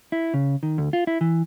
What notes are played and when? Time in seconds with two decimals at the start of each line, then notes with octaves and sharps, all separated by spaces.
0.12 E4
0.34 C#3
0.63 D#3
0.78 D2
0.93 F4
1.07 E4
1.21 E3